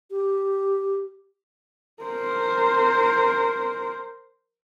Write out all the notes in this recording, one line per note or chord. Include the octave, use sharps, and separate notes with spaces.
G4
A#4 C5